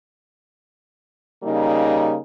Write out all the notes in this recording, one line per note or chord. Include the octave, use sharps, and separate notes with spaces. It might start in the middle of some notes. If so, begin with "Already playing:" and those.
C#3 G3 A#3 D#4